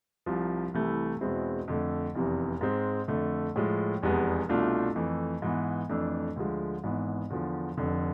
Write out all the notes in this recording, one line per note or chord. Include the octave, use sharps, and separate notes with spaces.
C2 C3 F3
C2 C3 E3 A3 E4
E2 B2 G#3 C4 E4
F2 D3 A3
F1 E2 C3 E3
G#2 G#3 C4
F2 D3 A3
A2 F3 G#3
F1 E2 C3 G#3 B3
C2 B2 A3 D4 F4
F2 E3 A3
G#2 E3 B3
F2 E3 A3 D4
D2 D3 F3 G#3
G#1 G#2 E3 B3
E2 D3 F3
F1 F2 D3